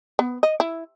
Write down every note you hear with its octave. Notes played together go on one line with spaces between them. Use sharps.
B3
D#5
E4